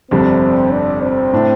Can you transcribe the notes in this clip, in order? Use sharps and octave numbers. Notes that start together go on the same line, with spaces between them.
G1 F2 C3 G3 C4 D4
D4
C4
A2 A3 D4